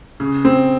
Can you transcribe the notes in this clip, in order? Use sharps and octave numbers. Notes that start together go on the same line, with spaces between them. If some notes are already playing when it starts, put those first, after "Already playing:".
C#3
C4